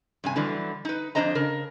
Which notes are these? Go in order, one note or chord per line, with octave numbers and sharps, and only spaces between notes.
G2 C3 G#5
D3 E3 F#3 G3
D#4 B4
F2 F#3 D4 C5 D#5 A#5
C#3 A#4